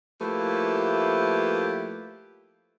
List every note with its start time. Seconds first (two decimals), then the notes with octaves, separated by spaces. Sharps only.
0.21 F3 A3 A#3 E4 G4 B4